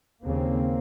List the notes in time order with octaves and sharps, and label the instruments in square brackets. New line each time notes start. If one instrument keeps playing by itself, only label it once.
[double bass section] D#2 C#3 A#3 C4